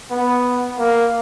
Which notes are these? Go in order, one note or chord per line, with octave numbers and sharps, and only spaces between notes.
B3
A#3